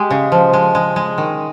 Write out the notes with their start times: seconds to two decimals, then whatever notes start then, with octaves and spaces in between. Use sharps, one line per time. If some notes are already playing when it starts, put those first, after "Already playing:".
Already playing: G#3 G4
0.10 C#3
0.32 F3
0.53 G#3
0.75 G#3
0.96 G#3
1.18 D#3